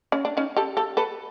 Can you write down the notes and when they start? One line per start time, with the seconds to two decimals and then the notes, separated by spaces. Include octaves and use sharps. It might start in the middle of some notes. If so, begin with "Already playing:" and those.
0.12 C#4
0.25 D4
0.37 C#4 D#4
0.57 G4 A4
0.77 G4 A4
0.97 A4 B4